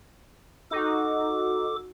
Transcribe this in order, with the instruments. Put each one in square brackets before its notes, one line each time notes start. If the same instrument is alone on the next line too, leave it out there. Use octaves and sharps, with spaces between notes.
[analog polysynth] D#4 F#4 [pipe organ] A4 D6